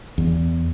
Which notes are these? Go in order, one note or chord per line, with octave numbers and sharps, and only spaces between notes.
E2